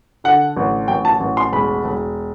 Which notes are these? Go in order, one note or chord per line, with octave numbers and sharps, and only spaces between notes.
D3 F#5
A1
A1 G5
A5
A1
C6
E1 B5
E1